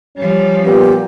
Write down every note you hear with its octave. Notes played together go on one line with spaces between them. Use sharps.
F3 G3 C#4
A#2 B3 G4